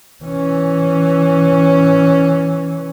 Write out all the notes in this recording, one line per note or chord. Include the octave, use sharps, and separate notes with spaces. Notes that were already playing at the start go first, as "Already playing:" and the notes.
E3 C#4